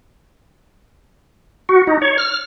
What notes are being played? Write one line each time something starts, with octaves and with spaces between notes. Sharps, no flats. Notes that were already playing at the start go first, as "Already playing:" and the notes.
F#4
D#4
C#5
F6